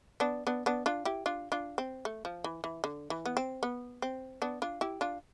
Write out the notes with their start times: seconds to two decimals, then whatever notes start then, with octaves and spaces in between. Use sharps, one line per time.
0.20 B3 D4
0.47 B3 D4
0.66 B3 D4
0.86 D4 F4
1.05 E4 G4
1.26 D4 F4
1.52 D4 F4
1.78 C4
2.05 A3
2.25 F3
2.44 E3
2.64 E3
2.84 D3
3.10 E3
3.25 B3
3.37 C4
3.63 B3
4.02 C4
4.42 B3 D4
4.62 D4 F4
4.81 E4 G4
5.01 D4 F4